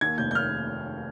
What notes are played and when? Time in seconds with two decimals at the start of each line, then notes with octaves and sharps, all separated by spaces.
0.01 D#2 G#6
0.18 F1 G6
0.31 G6
0.35 F6